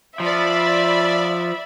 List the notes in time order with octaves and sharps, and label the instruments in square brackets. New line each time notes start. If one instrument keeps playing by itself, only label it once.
[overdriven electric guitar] F3 [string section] D5 B5 [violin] E5